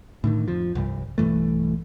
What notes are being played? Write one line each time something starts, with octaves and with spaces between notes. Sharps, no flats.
A2 D3 D#3
F2 F3
C2 G2
B1 G2 E3 A3